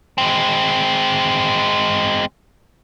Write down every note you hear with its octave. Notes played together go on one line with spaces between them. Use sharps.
G#3 C4